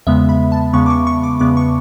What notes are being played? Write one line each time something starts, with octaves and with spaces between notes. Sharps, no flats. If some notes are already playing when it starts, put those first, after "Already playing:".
E2 C#3 G#3 B3 E5
B5
A5
E2 C#3 G#3 B3 C#6
D6
C#6
C#6
D6
E2 C#3 G#3 B3 D6
C#6